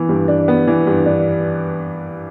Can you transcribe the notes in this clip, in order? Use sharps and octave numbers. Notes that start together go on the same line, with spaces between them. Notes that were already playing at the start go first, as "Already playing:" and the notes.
Already playing: E3 B3
G2
D4
B3
E3
G2
D4